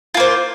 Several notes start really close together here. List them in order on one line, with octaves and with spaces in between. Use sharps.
F4 A#3 C5